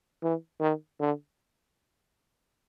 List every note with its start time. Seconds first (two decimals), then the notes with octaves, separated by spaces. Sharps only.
0.23 E3
0.61 D#3
1.00 D3